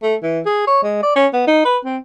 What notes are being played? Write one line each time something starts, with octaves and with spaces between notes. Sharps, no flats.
A3
E3
G#4
C#5
G#3
D5
C#4
B3
D#4
B4
C4